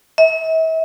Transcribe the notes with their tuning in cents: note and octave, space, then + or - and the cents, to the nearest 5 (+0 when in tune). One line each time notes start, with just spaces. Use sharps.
E5 -40